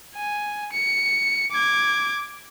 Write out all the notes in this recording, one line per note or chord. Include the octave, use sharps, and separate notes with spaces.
G#5
C#7
D6 G#6